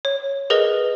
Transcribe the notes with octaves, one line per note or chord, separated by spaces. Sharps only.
C#5
G#4 A#4 B4 D#5